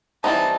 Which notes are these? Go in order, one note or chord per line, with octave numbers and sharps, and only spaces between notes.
E3 G3 C4 D#4 A5